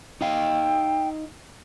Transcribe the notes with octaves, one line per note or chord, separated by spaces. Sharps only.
D#4 D#5 F5 G5